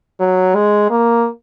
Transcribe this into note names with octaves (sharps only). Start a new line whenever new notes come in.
F#3
G#3
A#3